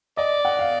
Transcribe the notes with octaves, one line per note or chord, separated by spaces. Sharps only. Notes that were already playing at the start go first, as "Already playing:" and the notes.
D5 D#5
F#5
F5